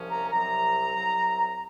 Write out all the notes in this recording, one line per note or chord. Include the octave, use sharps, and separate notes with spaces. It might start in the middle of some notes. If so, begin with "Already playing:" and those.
Already playing: C2 C3 F3 A#3 C#4
A#5
C2 C3 F#3 A#5
C2 C3 F#3